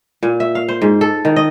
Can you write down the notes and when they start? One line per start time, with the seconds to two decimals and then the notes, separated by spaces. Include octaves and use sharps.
0.23 A#2
0.40 E5
0.55 F5
0.69 C5
0.82 G#2
1.01 A4
1.25 D#3
1.36 D#5